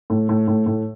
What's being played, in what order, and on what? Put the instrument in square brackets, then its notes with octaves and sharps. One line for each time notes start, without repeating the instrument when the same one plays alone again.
[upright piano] A2
A2
A2
A2